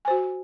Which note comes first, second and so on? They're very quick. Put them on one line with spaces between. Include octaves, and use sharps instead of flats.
G#5 C5 F#4